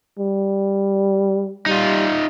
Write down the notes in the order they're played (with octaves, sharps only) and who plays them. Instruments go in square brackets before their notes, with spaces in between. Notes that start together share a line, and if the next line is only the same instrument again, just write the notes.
[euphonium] G3
[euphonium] G3 [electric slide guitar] D#4 F4